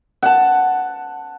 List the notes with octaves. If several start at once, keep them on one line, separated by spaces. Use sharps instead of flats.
F#5 A5